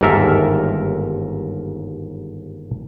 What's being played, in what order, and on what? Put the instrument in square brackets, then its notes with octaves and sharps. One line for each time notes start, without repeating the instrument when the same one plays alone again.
[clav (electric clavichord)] G1 D#2 G#2 A4 A#4 E5